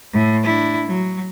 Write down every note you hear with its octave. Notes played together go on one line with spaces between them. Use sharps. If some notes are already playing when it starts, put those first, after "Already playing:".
A2
D4 E4
F#3